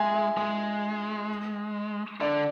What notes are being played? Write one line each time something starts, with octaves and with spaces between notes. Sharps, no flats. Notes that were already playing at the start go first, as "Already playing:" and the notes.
Already playing: G#3 E5 G#5
E5
G#3 G#5
D3 D5